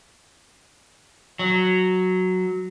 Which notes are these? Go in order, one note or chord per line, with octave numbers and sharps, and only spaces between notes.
F#3